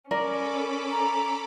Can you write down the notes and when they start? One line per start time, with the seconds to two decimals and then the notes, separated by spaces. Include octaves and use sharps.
0.11 C#4 A4 A#4 D5 B5 D6
0.92 A#5